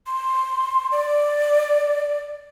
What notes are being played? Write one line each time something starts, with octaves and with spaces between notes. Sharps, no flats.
C6
D5